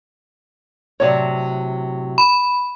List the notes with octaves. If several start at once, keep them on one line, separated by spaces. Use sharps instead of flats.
A2 C3 F#3 C#5 D5
B5